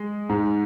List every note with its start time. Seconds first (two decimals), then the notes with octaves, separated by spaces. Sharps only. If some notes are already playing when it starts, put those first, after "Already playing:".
Already playing: G#3
0.29 G#2